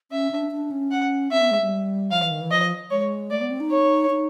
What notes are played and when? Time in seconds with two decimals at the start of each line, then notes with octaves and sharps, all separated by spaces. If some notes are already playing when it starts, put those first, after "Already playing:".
0.11 C#4 E5
0.31 D4
0.52 D4
0.71 C#4
0.91 F#5
1.31 C4 E5
1.41 B3
1.51 G#3
1.62 G3
2.11 F3 F5
2.21 E3
2.31 D#3
2.41 E3
2.51 F3 D#5
2.90 G#3 C#5
3.31 A3 D5
3.41 B3
3.51 C4
3.60 D#4
3.71 C#5
4.11 D#4